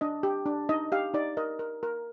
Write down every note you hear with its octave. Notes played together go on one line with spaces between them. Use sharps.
D4 D#5
G4
D4
D#4 D#5
G4 F5
D#4 D5
A#4 D#5
A#4
A#4